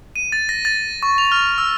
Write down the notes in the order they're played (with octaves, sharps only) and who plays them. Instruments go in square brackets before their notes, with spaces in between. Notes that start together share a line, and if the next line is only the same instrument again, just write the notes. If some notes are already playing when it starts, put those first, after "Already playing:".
[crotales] D#7
A6
A#6
A6
C#6
F7
F6
E6